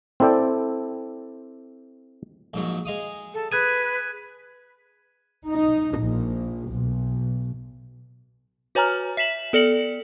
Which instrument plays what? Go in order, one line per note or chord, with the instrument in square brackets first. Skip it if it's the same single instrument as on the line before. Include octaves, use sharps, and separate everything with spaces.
[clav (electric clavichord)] C4 E4 A4 D5 G5
[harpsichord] A#1 G#2 F#3
G#3 F5 D#6
[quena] A4
[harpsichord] G#4 [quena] B4 [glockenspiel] F#6 G#6 D#7
[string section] D#4
A#1
B1
[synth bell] F#4 B4 C#5 G#5 A#5 F6
E5 B6 E7 F#7
B3 A4 D5 C#7 F#7